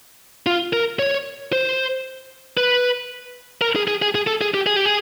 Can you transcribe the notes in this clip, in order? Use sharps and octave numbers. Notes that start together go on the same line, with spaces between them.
F4
A#4
C#5
C5
B4
A#4
G#4
G#4
G#4
G#4
A4
G#4
G4
G#4
G4
G#4